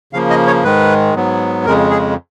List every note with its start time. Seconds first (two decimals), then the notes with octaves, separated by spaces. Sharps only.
0.13 C#3 F3 A#3 F5
0.30 D#5
0.47 C#5
0.64 G#2 D#3 G#3 B4
1.15 G#2 F#3 B3
1.66 F2 C#3 G#3 A#4
1.90 G#4